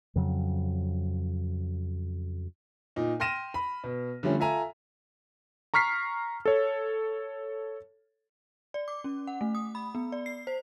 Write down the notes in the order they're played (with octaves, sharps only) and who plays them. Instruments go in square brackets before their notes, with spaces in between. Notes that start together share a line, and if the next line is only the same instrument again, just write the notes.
[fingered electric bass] F2 C#3 F#3
[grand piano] A#2 D#4
G5 C6 F6 A#6 D#7 E7
B5
B2
D3 F3 G3 A3 C#4
F4 A4 E5 G#5 A#5
[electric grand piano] A#5 C#6 F6 B6 C7
A4 C#5
[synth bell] D5
D6
C#4
F#5
A3
D#6
B5
B3
D5
C7
C5